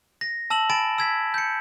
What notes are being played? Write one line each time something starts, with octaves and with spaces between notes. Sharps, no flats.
A#6
A5 E6 E7 F#7
G#5 B5 A6 D7 E7
E6 G#6 B6
G6 C#7